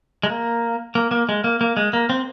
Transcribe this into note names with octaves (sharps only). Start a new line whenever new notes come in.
G#3
A#3
A#3
A#3
G#3
A#3
A#3
G#3
A#3
C4